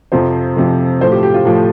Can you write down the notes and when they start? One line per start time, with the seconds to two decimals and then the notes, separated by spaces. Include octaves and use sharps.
0.12 F2 C3 F3 C5
0.56 F2 C3 F3
1.01 A2 F3 C5
1.11 G4
1.23 G4
1.34 F4
1.45 A2 F3